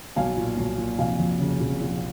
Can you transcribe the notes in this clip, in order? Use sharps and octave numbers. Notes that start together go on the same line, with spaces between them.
B1 F5 G#5
A#2
B1
A#2
F1 F5 G#5
F2
C#3
F1
A#1